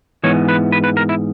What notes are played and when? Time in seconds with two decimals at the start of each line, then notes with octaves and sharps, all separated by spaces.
0.24 G#2 E3 B3 C#5
0.48 B4
0.72 B4
0.84 B4
0.97 A#4
1.09 E4